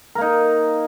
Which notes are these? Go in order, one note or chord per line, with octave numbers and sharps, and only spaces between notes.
A#3 D#4 A#4